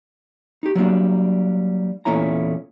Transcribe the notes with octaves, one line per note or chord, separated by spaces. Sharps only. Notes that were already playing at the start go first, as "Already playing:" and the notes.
D#4 G4
F#3 G3 A#3 D4
E2 A#2 A3 C#4 E4 A#5